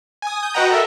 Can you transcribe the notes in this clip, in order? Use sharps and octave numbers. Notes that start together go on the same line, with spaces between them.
G#5 D#6
D#6 G6
F#4 B4 D#5 F#5 G5 A#5
A4 A#4 E5